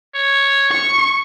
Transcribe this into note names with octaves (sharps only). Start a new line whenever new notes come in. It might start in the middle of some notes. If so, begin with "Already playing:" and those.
C#5
C#6